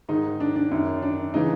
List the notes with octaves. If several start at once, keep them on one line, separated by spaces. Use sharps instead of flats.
G#2 D#3 D#4
D4
D4
F#2 D#3
D4
C#3 E3 D#4